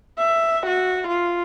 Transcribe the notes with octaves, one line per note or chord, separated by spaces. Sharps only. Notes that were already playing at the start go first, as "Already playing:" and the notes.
E5
F#4
F4